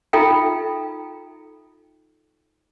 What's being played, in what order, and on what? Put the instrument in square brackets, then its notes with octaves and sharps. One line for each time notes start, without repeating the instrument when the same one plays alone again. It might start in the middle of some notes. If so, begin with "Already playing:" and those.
[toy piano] D#4 F4 A4 E5 G5 A#5